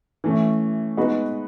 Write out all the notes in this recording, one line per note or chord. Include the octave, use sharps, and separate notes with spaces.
E3 A3 C#4
G#3 B3 D#4 F#4 B4